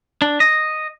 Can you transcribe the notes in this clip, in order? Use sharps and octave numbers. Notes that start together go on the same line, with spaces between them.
D4
D#5